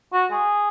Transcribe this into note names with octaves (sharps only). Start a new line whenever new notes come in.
F#4
G#4